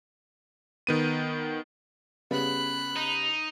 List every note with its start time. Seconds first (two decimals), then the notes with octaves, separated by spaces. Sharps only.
0.87 D#3 B3 D#7
2.31 C#3 G3 B3 B5 F#6
2.96 D#4